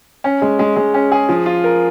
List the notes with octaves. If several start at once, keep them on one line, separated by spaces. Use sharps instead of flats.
C#4
G#3
G#3
G#3
C#4
G#4
F3
F4
A#4